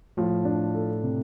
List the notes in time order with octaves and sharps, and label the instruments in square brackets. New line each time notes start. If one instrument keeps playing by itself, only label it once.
[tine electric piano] A2 [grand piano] F3
[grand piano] D4
A4
C3